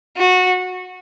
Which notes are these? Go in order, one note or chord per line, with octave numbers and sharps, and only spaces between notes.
F#4